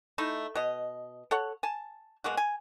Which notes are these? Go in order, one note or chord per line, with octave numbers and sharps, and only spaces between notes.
A3 D#4 E4
B2 D#5
A4 C#5 F#5
G#5 A5
B2 G#3 A#3 F#4
G#5